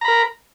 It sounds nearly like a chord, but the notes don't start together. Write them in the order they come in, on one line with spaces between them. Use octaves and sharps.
A#5 B5 A#4